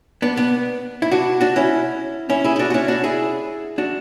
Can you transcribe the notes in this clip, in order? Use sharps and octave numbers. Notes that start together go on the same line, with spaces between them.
B3 D4
B3 D4
E4
D4 F#4
D4 F#4
C#4 E4
C#4 E4
E4 G#4
E4
D4 F#4
F#4
C#4 E4
D4 F#4
E4 G#4
D4 F#4